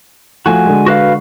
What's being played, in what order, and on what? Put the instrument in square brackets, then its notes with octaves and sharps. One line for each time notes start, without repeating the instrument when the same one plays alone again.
[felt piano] F3 A3 [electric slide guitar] F#4 G#5
[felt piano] D3 G#3
[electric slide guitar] F#4 B4 F5